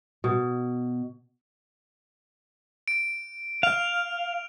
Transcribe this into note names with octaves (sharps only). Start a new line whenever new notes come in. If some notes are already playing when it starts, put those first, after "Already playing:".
B2
D7
F5 F6 F7